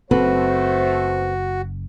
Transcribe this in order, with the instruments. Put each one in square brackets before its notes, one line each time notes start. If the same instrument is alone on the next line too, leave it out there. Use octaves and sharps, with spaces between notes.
[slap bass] F#1 [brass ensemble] A3 C5 [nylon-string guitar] C4 A4 B4 [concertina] F#4